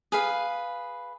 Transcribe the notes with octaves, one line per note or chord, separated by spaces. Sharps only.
G#4 B4 F5